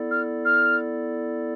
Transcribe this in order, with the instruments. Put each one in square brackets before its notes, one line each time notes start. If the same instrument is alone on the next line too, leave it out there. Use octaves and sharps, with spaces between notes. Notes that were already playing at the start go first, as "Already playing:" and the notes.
Already playing: [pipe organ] B3 E4 A4 D5
[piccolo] F6
F6